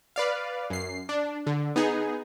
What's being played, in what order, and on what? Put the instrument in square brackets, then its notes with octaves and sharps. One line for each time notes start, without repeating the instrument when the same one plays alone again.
[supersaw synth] B4 D5 F5
F#2 C7
D4
D3
B3 D#4 G#4